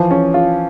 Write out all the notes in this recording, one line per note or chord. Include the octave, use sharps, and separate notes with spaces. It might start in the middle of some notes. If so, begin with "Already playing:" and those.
Already playing: E3 F3
C#4
F4